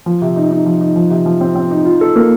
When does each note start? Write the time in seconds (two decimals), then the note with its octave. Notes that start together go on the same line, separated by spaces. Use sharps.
0.06 F3
0.22 C3
0.36 D#4
0.51 D#4
0.66 F3
0.81 D#4
0.96 F3
1.10 C3
1.26 F3
1.41 C4
1.55 C4
1.71 D#4
1.85 F4
2.01 A4
2.16 A#3